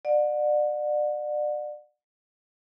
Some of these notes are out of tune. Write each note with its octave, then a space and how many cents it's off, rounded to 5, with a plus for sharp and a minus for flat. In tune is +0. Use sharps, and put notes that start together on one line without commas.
D5 +30 F#5 -30